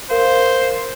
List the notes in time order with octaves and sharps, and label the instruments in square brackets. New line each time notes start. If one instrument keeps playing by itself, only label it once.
[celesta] A#4 F5 [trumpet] C5